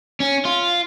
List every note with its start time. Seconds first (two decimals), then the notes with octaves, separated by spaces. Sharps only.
0.20 C#4
0.45 F4